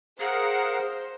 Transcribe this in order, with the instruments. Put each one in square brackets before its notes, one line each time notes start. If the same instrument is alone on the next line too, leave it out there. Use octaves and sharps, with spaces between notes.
[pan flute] G#4 [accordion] A#4 F5 F#5 [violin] C5